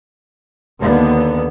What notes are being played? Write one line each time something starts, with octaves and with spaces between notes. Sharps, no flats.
D#2 D3 B3